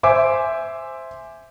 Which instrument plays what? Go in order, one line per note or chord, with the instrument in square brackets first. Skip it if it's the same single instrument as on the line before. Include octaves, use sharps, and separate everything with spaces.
[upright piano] C5 E5 G#5 D6